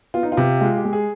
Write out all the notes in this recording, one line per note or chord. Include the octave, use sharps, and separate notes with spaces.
B3 F4
D#4
F4
C3
G#3 F4
G4
G#3
G#4